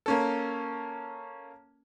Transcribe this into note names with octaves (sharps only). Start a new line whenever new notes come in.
A#3 C#4 A4